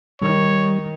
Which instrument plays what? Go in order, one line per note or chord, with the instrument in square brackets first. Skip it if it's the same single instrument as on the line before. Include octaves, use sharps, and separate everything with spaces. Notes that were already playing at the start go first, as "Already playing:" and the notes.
[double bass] D#3 [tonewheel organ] G3 [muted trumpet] C#5